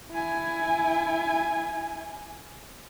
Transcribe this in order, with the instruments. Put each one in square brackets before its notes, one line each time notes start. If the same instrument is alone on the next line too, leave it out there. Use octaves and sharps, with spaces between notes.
[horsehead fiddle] E4 G#5